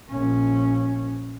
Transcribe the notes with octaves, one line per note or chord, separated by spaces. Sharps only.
A#1 C#4